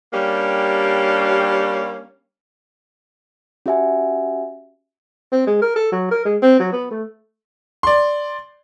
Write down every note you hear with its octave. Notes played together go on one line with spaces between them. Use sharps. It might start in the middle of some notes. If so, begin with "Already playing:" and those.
G3 A#3 C#4 D4 G4
C#4 F#4 G4 E5 F#5 G#5
C4
G#3
A#4
A4
F#3
A#4
G#3
C4
F#3
B3
A3
D5 C6